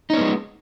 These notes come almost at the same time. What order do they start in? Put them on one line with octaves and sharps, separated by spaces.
D#4 C#4 B3 G#3